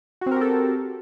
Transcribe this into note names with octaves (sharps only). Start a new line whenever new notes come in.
C4 F#4 G4 A4 A#4